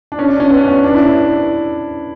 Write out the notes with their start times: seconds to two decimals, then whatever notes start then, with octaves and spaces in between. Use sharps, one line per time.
0.12 D4
0.19 C#4
0.29 D4
0.40 C#4
0.50 B3
0.68 C#4
0.84 D4
0.94 E4